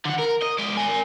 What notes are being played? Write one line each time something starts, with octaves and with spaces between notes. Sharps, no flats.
D3 F#5
A#4
D#5
G#3 D5
A#4 G#5